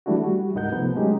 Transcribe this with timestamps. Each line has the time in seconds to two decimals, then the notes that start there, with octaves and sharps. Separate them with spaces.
0.06 E3 G3 A3 D4 E4 F#4
0.21 G3 F#4
0.55 C#2 G#2 D#4 A#4 F#5 G6
0.72 C3 F3 A3 B3
0.96 F#3 G#3 C#4 D#4 G4